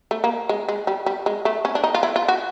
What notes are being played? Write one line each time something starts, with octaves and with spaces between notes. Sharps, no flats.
A3
A#3
G#3
G#3
G3
G3
G#3
A3
C#4
D4
D#4
F4
E4
F4
F#4